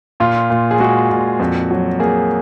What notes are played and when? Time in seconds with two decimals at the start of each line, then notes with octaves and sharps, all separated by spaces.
0.20 A#2 F4
0.50 A#2
0.71 G#4
0.80 G#3 F#4
1.11 A#2
1.39 F2
1.71 F#3
1.99 A#3 G#4